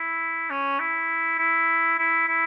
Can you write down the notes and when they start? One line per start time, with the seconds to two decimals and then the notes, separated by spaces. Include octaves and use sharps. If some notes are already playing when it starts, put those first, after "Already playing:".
Already playing: E4
0.50 C#4
0.79 E4
1.38 E4
1.98 E4
2.27 E4